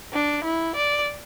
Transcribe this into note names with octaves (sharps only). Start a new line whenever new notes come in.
D4
E4
D5